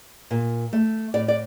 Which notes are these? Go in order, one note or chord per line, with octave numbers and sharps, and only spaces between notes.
A#2
A3
A2 D5
D5